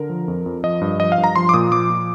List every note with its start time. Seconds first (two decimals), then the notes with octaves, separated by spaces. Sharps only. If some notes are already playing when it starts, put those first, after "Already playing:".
Already playing: D3 A#4
0.10 F3
0.28 F2
0.46 F2
0.64 F3 D#5
0.81 G2
0.99 F3 D#5
1.12 F5
1.18 G2
1.24 A#5
1.36 F3 C6
1.49 D6
1.54 A#2 D#6
1.72 F3 D6
1.90 A#2